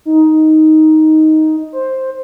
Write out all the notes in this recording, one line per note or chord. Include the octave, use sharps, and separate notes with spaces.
D#4
C5